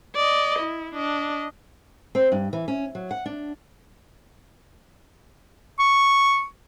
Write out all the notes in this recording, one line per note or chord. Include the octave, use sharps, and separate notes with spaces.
D5 D#5
E4
D4 D#5
C4
G2
E3
C#4
F#3
F#5
D4
C#6